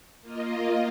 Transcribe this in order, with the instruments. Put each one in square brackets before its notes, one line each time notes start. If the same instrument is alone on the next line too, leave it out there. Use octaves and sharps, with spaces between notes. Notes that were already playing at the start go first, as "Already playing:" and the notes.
[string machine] A#3 F4 D#5